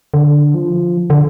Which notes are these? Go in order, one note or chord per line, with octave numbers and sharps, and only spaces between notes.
D3
F3
D3